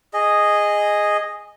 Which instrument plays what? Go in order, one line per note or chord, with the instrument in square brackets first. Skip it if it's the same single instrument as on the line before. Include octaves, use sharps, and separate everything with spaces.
[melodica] G#4 D#5